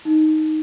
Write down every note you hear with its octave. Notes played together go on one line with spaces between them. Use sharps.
D#4